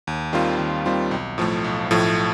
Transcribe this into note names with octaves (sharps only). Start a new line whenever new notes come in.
D#2
D#3 G3 C4 F4
D#2
D#3 G3 C4 F4
B1
A2 F3 A3
B1
A2 F3 A3